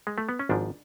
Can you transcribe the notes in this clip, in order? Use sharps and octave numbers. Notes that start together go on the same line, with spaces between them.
G#3
A3
B3
C#4
G#1 G#2 F3 D4